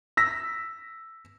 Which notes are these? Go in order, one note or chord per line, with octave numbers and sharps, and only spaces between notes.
E6 A#6 B6